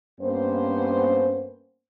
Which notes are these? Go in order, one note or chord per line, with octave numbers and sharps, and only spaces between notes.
G2 A#3 B3 C#4 C5